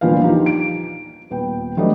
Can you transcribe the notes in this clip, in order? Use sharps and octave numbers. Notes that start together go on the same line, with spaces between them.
D#1 A#2 D3 F3 B3 F5
F3 D4 D#4 G4
D7
D#1 B3 G5
F#3 G3 A3 B3 D4 D#5